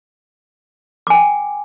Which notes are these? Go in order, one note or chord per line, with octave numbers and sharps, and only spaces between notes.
G5 G#5 D6